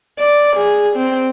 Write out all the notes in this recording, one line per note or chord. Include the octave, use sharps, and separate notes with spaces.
D5
G#4
C4